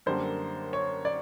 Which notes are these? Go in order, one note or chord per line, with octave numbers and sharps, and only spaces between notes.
F#2 D3 G3 A#3 C5
C#5
D5